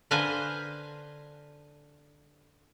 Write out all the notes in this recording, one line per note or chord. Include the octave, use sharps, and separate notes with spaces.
D3 B4 C5 F5 G#5 A#5